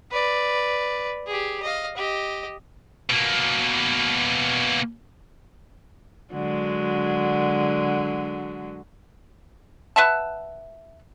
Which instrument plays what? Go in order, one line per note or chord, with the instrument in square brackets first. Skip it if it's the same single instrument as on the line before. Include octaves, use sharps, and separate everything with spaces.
[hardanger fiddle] B4 D5
G4 G#4
D#5 F5
G4 D#5
[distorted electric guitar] B2 A#3
[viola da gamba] D3 F#3 G#3
[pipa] B4 E5 F#5 A5